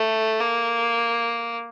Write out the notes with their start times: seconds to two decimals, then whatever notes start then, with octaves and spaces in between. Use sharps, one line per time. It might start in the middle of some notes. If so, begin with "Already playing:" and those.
Already playing: A3
0.41 A#3